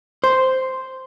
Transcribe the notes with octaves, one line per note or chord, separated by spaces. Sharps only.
C5